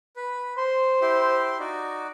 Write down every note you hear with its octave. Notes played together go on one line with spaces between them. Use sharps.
B4
C5 C6
E4 G4 C6
D#4 F#4 D5